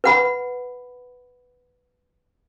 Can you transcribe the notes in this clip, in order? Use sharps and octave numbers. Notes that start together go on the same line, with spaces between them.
B4 F#5 B5